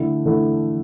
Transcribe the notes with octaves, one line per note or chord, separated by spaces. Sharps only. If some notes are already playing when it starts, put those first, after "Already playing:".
Already playing: D3 A3 E4
D3 A3 E4